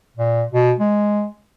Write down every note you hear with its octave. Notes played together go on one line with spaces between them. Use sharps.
A#2
B2
G#3